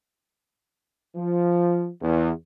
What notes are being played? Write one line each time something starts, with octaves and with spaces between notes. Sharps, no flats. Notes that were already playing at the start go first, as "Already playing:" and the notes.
F3
E2